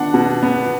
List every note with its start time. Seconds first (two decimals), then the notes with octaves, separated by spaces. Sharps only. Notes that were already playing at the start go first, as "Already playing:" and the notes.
Already playing: B3 D4 F#5
0.14 B2
0.43 B3